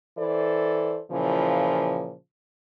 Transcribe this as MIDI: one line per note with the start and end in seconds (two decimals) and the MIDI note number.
0.17 1.00 52
0.17 1.00 69
0.17 1.00 72
0.17 1.00 74
1.11 2.15 46
1.11 2.15 49
1.11 2.15 52
1.11 2.15 53